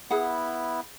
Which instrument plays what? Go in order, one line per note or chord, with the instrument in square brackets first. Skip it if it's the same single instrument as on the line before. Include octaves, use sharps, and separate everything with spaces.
[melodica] B3 E4 [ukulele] G#4 F#5